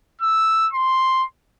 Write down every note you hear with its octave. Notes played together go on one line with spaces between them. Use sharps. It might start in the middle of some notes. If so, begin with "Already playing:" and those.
E6
C6